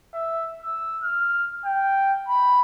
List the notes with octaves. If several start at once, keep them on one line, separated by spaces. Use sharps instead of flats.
E5
E6
F6
G5
B5